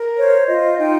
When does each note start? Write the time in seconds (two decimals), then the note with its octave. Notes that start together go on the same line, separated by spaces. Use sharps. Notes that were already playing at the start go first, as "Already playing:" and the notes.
Already playing: A#4
0.16 C5 C#5
0.48 F4 D#5
0.79 D#4 G5